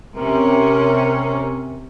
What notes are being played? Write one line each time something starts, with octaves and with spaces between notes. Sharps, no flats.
C3 C#4 A#4